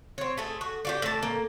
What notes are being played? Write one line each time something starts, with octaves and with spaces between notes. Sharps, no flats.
C4 C#5
A3 G#4
F#4
D4 F#4 G4
A2 A5
A#3